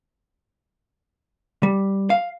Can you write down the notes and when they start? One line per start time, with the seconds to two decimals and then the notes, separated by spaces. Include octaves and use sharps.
1.63 G3
2.10 F5